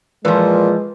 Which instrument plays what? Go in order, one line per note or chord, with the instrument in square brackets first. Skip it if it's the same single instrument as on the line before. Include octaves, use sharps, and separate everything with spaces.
[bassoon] A#2 [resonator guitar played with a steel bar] E3 F3 [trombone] G#3 [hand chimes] B4